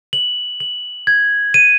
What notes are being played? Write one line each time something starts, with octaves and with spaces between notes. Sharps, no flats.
F#7
F#7
G#6
D#7